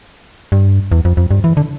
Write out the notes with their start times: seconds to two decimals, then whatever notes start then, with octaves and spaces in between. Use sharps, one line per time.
0.52 G2
0.92 E2
1.05 F2
1.17 F2
1.31 G2
1.44 E3
1.57 D3